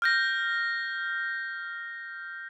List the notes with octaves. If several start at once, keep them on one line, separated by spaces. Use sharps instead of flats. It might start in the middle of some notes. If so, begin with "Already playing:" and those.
F6 G6 A#6